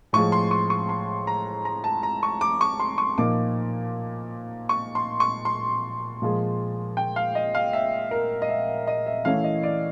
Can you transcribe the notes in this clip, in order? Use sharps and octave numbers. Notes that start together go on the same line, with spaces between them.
A2 F3 G#3 C#6
C6
C#6
C#6
C6
A#5
A#5
A5
A#5
C#6
D6
C#6
C6
C#6
A#2 F3 A#3 D#4 D6
C#6
C6
C#6
C6
A#2 F3 G#3
G5
F5
D#5
F5
E5
A#4
D#5
E5
D#5
E5
E3 A3 C#4 E4 F5
D#5
D5